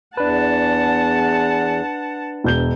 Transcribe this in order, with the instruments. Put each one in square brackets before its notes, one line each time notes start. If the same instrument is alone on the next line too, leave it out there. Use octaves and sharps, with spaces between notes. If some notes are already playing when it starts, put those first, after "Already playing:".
[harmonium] E2 [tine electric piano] D4 B4 [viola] F#5 A5
[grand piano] E1 G6 G7